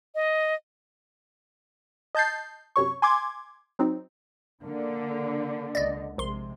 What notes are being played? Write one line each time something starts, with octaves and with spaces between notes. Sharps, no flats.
D#5
D#5 A5 G6 A6 C7
F#2 C3 C#5 C#6
G#5 C6 D6 G#6
F#3 C4 D#4
D3 A#3
C#2 D5 D#5
A#1 C3 G#3 C6